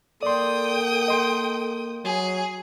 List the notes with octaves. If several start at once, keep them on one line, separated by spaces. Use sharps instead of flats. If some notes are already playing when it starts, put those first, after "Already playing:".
A#3 A4 D5 G5 C6 D#6
D#5 C6
F#3 G#4